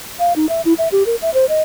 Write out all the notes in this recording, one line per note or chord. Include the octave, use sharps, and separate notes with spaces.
F5
D#4
E5
E4
E5
G4
A#4
E5
C5
D#5